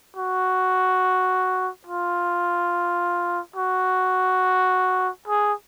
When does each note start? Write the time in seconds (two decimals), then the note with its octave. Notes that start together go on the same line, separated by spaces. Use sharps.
0.16 F#4
1.86 F4
3.56 F#4
5.27 G#4